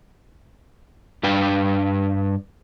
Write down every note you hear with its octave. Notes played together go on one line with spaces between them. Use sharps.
G2 D4 B4 F5 G5